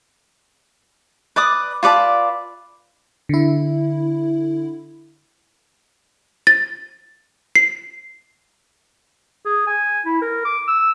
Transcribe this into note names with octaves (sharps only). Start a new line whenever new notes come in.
B4 D5 D6 D#6
F4 B4 D5 A5
D3 E4
A6
C7
G#4
G#5
E4
A#4
D6
E6